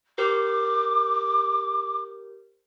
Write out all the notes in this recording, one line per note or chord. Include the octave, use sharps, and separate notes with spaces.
G4 A#4 C5 D6